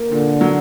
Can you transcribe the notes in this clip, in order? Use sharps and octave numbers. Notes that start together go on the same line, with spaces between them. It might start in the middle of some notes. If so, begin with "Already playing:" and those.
Already playing: A#3
A#2 D3
F#3